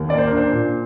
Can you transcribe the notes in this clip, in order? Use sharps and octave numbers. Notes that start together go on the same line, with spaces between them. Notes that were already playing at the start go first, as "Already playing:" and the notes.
Already playing: D#2
A#3 D5
C5
D4 A#4
C5
A#2